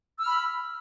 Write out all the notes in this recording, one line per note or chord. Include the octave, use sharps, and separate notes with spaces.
B5 E6 F6